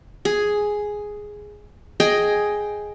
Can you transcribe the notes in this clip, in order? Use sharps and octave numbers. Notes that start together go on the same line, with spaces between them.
G#4
G#4 D#5 G5